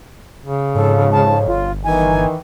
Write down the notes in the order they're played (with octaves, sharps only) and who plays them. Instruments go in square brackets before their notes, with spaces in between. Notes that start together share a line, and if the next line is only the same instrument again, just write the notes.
[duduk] C#3
[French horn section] F2 F3 C#5 [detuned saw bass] G#2 [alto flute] A4
[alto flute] A5
[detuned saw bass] G1 [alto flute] F4
[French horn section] D#3 [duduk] E3 [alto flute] G#5